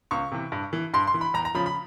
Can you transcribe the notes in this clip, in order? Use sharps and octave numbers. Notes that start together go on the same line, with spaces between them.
C#2 C#6
C3 E3
G2
E3
G2 C6
C6
E3
B5
E2 A#5
A#5
C#3 F3 B5
B5